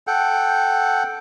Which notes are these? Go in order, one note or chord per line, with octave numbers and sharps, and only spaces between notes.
A4 F#5 G5